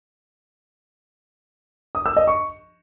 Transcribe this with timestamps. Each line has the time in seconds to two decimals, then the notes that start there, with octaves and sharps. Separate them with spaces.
1.95 D#6
2.06 E6
2.17 D#5
2.27 C#6